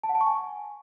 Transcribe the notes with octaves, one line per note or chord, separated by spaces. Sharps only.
A5
F#5
A5
C#6
G#5